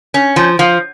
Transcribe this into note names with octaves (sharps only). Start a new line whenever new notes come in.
C#4
F3
F3